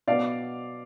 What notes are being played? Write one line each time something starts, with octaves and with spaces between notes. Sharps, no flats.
B2 B3 D5 F5